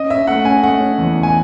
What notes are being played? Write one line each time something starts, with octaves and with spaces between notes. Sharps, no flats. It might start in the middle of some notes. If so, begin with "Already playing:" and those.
Already playing: C#4 D#5
C#4 E5
A3 F#5
C#4 G#5
A3 F#5
C#4
E2
E2
G#5